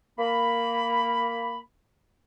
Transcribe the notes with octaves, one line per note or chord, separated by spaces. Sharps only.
A#3 B5